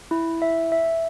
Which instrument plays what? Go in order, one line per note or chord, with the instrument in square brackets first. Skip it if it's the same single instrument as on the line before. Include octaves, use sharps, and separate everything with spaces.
[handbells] E4
E5
E5